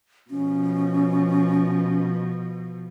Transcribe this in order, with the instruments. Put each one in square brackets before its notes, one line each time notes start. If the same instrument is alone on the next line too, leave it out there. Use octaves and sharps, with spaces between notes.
[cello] B2 F3 [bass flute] C#4